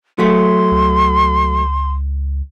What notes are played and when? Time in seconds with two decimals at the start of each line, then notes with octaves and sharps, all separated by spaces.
0.19 F#3 A3 C6
0.72 C#2